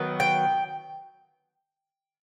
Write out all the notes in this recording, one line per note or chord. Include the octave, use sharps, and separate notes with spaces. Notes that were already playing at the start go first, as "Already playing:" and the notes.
Already playing: D#3 F#3 B3
G5